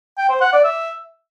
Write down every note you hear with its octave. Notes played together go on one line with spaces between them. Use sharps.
G5
C5
F#5
D5
E5